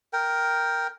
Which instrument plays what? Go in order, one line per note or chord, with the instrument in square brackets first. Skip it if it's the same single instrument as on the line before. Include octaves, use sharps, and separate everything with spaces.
[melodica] A#4 G5